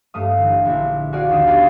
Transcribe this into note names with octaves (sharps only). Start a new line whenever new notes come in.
G2 A3 F5 D#6
A1 D3
A#1 E4
F#4 G#4 D5 F5
D#2 D#3 D4 D5 D#6
B3 G4 G#4 D#5 F5